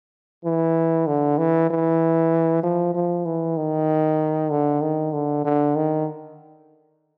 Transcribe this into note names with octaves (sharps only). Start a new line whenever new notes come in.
E3
D3
E3
E3
F3
F3
E3
D#3
D3
D#3
D3
D3
D#3